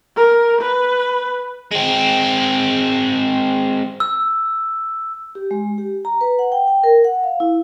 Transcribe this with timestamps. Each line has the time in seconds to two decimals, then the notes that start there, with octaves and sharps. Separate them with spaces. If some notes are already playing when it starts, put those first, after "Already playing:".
0.17 A#4
0.61 B4
1.71 G#3 C4
4.00 E6
5.35 G4
5.51 G#3
5.78 G4
6.05 A#5
6.21 B4
6.39 F#5
6.52 G5
6.68 G5
6.84 A#4
7.04 F#5
7.24 F5
7.40 E4